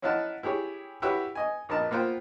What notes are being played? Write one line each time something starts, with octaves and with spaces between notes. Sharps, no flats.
C#4 D#4 E4 F5 F#5 A5
E4 G4 G#4 C#5
E4 F#4 G4 B4 C#5 E5
D#5 G#5
A#1 D#4 A#4 A5
A#3 B3 F4 C5 G5